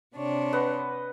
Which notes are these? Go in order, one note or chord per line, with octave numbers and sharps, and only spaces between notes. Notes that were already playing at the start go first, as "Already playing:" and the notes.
C3 D4 C#5
B4 D#5 F#5